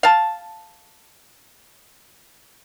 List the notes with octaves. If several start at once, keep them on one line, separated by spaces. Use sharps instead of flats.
F5 A5